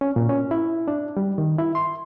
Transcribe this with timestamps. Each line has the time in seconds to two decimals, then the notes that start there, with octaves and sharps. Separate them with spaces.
0.01 C#4
0.16 A#2
0.29 C#4
0.51 E4
0.88 D4
1.17 G3
1.38 D#3
1.58 E4
1.75 C6